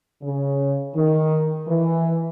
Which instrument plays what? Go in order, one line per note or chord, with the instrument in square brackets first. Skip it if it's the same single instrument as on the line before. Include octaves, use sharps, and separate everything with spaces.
[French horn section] C#3
D#3
E3